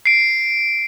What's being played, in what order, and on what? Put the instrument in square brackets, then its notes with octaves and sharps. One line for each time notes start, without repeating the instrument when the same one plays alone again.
[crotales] C7 D7